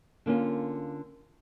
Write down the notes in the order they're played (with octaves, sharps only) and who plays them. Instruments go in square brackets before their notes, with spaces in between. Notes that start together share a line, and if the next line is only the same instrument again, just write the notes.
[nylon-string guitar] D3 A#3 C#4 F4